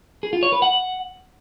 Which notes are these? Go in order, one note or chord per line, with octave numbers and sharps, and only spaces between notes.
G#4
F4
C#5
B4
F#5